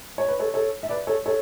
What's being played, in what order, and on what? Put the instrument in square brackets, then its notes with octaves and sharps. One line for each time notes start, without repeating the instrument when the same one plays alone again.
[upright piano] C#5
B4
A4 C#5
A4 C#5
E5
B4 D5
A4 C#5
A4 C#5